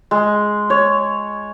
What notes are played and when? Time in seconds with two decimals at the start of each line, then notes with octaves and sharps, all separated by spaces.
0.11 G#3
0.70 C#5